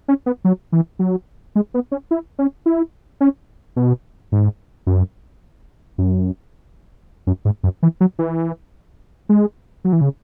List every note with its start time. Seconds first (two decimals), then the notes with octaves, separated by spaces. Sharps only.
0.08 C#4
0.26 B3
0.44 F#3
0.72 E3
0.99 F#3
1.55 G#3
1.74 B3
1.92 C#4
2.11 E4
2.39 C#4
2.66 E4
3.21 C#4
3.76 B2
4.32 G#2
4.87 F#2
5.98 F#2
7.27 F#2
7.45 G#2
7.63 F#2
7.83 E3
8.00 F#3
8.19 E3
9.29 G#3
9.84 F#3
9.93 E3
10.01 C#3